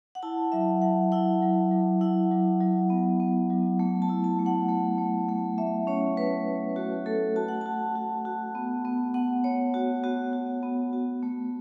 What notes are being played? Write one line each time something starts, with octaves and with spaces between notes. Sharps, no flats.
F#5
E4 A5
F#3 E5
F#3 F#5
E4 F#5
F#3
F#3
E4 F#5
F#3
F#3
B3
B3
F#3
A3
A5
E4
A5
A3
F#5
A3
A3
A3
A3 E5
C#4 C#5
A3 B4
A3
A3 F#4
A3 A4
F#4 A5
F#5
F#4 A5
F#4
F#4
B3
B3
B3 F#5
B3 C#5
F#4
B3 F#4
F#4
B3
F#4
A3